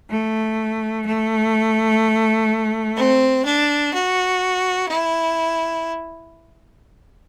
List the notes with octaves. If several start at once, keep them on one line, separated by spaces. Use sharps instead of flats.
A3
A3
C4
D4
F#4
E4